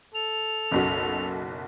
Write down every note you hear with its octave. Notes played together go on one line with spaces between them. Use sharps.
A4 F7
F#1 B1 F#4